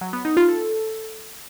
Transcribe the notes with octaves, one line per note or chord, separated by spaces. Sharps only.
F#3
B3
D#4
F4
A4